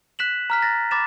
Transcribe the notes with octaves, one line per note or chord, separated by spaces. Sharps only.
F#6 B6 E7 F#7
A#5 F6 B6
A6 A#6
B5 D6 A6 E7